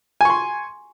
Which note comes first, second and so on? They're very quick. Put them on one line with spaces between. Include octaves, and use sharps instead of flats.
G#5 C#6 C6